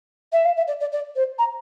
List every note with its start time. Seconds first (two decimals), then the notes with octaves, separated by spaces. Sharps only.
0.32 E5
0.45 F5
0.57 E5
0.67 D5
0.80 D5
0.92 D5
1.16 C5
1.38 A#5